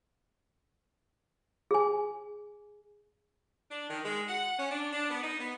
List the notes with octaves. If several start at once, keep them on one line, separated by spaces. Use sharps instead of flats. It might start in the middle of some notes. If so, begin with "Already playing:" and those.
G#4 G#5
D4
D#3
G#3
F#5
C#4
D4
D4
B3
D#4
B3